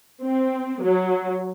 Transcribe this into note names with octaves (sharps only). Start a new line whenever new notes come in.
C4
F#3